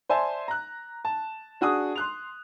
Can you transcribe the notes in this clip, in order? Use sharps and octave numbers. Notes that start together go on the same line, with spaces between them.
C5 D5 E5 G#5 A5 C6
A#5 F#6
A5
D4 F#4 G#4 D#6
C6 F#6 F7